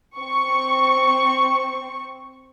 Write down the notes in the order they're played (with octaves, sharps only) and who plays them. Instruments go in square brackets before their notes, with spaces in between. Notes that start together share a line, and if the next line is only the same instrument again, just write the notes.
[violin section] C4 C#6